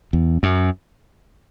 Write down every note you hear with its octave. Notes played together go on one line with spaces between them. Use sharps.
E2
F#2